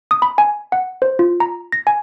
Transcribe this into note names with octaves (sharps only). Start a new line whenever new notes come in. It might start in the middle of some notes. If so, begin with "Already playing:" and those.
D#6
B5
G#5
F#5
C5
F4
A#5
A#6
G#5